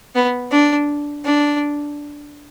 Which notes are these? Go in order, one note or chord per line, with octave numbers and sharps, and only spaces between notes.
B3
D4
D4